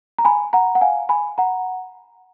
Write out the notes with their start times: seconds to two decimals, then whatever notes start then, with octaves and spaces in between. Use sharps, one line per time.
0.18 A#5
0.25 G#5 B5
0.53 F#5 A#5
0.75 F#5
0.81 F5 G#5
1.09 G#5 B5
1.38 F#5 A#5